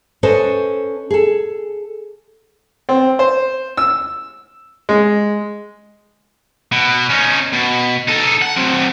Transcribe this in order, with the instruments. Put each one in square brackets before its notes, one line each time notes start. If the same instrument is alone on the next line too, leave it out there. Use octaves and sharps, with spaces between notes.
[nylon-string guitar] C#4 A4 B4 C5 D#5
G#4 A4
[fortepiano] C4
C5
E6
G#3
[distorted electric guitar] B2
C#4 D#4
B2
D#4 A4
F#5
F#3 C4